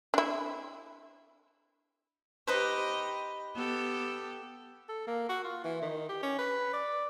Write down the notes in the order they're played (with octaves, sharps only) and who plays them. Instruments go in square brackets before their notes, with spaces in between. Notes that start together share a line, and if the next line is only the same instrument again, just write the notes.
[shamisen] D4 E4
[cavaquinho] D#4 B4 C5 [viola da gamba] G4 D#5
[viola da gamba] B3 G4 A4
[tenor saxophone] A4
A#3
F#4
F4
E3
D#3
G4
C#4
B4
D5